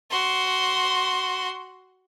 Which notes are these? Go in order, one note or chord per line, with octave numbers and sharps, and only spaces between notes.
F#4 C6